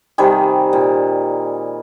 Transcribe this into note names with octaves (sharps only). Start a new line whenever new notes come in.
C3 D#3 G3 G#4
A#2